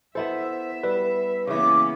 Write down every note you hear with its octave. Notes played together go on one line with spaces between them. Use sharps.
B3 E4 A4 C5 E5
G3 B4
C#3 E3 A#3 B3 C#4 D6